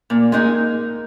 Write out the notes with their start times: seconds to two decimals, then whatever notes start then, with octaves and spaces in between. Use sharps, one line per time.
0.10 A#2 A#3
0.32 G#3 A#3 D#4 G#4